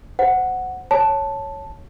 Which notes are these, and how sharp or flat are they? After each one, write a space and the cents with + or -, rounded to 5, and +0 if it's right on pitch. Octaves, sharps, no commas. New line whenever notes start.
C5 -15 F#5 +0
C#5 +0 A5 +0